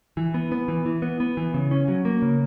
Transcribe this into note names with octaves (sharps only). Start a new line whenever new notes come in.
E3
B3
B3
E3
E3
B3
B3
E3
C#3
C#4
F#3
A#3
C#3